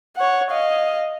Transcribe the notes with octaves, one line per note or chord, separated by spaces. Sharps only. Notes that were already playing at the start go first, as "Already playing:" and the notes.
C#5 F#5
D#5 F5